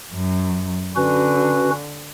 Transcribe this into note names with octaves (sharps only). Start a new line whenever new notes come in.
F#2
D3 C#4 F#4 B4